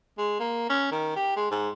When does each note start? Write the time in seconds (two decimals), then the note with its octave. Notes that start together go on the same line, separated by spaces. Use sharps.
0.18 G#3
0.40 A#3
0.70 C#4
0.91 D#3
1.16 G4
1.36 G#3
1.51 G#2